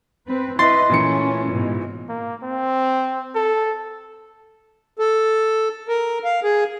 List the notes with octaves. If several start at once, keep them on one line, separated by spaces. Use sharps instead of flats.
C4 B4
E4 B4 D#5 C6 A6
A#2 E3 A3 C#4 C#7
G#2 B2
A#3
C4
A4
A4
A#4
F5
G#4